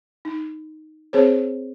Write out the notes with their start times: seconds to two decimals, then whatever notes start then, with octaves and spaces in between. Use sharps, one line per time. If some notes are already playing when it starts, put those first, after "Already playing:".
0.25 D#4
1.13 C4 G#4 C5 C#5